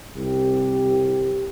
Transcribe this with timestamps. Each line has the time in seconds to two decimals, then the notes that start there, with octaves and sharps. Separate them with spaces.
0.18 C2 G4